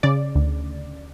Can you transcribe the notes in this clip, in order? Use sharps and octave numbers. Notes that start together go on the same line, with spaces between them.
C#3 D5
D2